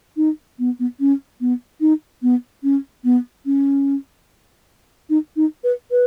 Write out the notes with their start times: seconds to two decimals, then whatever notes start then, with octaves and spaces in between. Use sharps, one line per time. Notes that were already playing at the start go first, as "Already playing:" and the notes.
0.17 D#4
0.59 B3
0.80 B3
1.00 C#4
1.41 B3
1.81 D#4
2.23 B3
2.63 C#4
3.04 B3
3.46 C#4
5.10 D#4
5.36 D#4
5.64 B4
5.91 B4